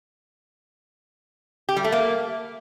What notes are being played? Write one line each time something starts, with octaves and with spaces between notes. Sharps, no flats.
G4
G3
A3
A#3